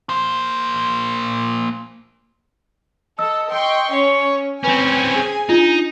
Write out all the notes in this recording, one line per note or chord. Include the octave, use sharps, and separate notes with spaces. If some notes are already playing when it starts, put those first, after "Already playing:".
A#3 C5
A4 D#5 E6
G5 C6 C#6 E6
C#4 C#5
C4 C#4 B4 G#5
G#4
D4 D#4 F4